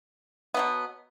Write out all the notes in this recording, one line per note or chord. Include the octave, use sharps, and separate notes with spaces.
B2 F#3 B3